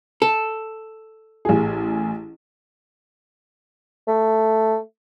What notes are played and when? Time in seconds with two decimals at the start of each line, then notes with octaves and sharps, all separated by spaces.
0.22 A4
1.45 A1 G#4
4.08 A3